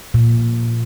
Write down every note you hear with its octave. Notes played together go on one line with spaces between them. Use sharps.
A#2